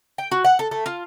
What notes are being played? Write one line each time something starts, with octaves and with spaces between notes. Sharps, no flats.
G5
F#4
F#5
A4
A3
F4